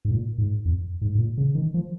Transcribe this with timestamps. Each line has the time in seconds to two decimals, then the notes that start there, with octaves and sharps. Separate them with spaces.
0.05 G#2
0.11 A#2
0.38 G#2
0.65 F2
1.01 G#2
1.15 G#2
1.19 A#2
1.37 C#3
1.55 D#3
1.74 F3